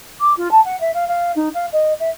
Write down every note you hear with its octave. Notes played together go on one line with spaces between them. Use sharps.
D6
F4
A5
F#5
E5
F5
F5
D#4
F5
D#5
E5